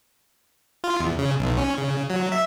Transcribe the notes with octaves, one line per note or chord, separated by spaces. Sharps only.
F4
E2
C#3
B1
C#4
C#3
F#3
E5